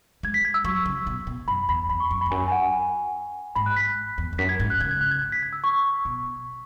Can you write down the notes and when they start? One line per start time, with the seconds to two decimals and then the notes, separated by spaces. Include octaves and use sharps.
0.23 G#3 G#6
0.34 B6
0.45 G#6
0.54 E6
0.65 F#3 C#6
0.86 C#3
1.07 B2
1.27 B2
1.48 F#2 B5
1.69 E2 B5
1.89 E2 B5
2.00 C#6
2.11 F#2
2.21 B5
2.26 E2
2.31 F#2 G#5
2.48 G#5
2.51 F#5
2.73 G#5
3.55 G#2 B5
3.66 F#6
3.76 B6
4.18 E2
4.33 E2
4.38 F#2 B6
4.49 G#6
4.60 G#2 G#6
4.70 F#6
4.80 C#3 G#6
4.91 G#6
5.01 F#6
5.11 G#6
5.22 G#6
5.32 B6
5.43 G#6
5.53 E6
5.64 C#6
6.05 B2